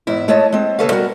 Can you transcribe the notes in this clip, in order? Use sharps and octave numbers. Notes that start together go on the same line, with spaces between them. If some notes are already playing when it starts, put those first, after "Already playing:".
E2 G#2 E4
G#3 A3 C#5 D#5 A5
G#3 C4
D#2 C#3 A4 B4 C#5 F5
G3 B3 F#4 A#4